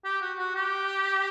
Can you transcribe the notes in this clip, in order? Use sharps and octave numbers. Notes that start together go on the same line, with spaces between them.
G4
F#4
F#4
G4